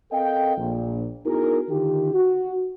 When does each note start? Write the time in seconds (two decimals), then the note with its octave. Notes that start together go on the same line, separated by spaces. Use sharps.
0.11 C4 A4 A#4 D#5 F5 G5
0.57 A#1 A#2
1.25 B3 D#4 E4 F#4 G#4 A#4
1.69 D3 D#3 D4 D#4 F4 G4
2.14 F#4